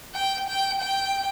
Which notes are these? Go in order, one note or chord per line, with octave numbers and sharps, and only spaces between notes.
G5
G5
G5